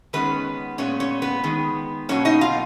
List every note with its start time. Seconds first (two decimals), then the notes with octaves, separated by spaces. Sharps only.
0.13 D#3 G#3 B3 C#4 B4
0.78 A#2 G#3 B3 C#4 C#5
1.00 C#4 C#5
1.22 B3 B4
1.44 D#3 G#3 B3
2.09 B2 F#3 A#3 C#4 C#5
2.25 D#4 D#5
2.41 F4 F5